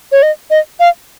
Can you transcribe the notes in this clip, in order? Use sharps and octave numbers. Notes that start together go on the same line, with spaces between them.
C#5
D#5
D#5
F5